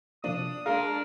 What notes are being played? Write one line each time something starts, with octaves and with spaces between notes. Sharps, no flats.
C3 F3 A#3 D4 D#6
G#3 A#3 D4 A#4 F5 A#5 C6